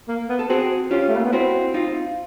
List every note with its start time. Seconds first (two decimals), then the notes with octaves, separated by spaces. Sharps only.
0.08 A#3
0.29 B3
0.39 A4
0.49 C4 F#4 G#4
0.91 C#4 F4 G4
1.08 A3
1.16 A#3
1.24 B3
1.33 C4 E4 F#4
1.74 D#4 F4